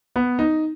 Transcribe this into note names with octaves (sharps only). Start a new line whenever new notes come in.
B3
D#4